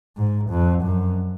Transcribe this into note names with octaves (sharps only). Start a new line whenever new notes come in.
G#2
F2
F#2